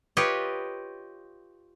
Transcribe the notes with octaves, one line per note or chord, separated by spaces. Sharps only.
F4 G4 B4 C#5 D#5